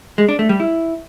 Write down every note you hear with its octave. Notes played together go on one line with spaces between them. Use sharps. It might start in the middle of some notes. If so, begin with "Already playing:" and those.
G#3
D4
A3
G3
E4